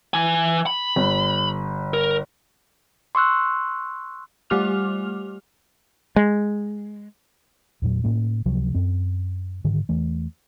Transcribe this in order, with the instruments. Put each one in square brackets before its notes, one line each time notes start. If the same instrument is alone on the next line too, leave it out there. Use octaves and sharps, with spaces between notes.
[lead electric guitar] E3 G#5
B5
[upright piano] G1
[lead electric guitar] A#4
[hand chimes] C6 C#6 E6 F#6
[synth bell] G3 A3 G4 D6 F6 F7
[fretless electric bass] G#3
[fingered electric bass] E2 A#2 F#3
A2 A#3 C#4
C#2 C3 F3 F#3
F#2 C4
G#2 D3 D#3
E2 E3 A3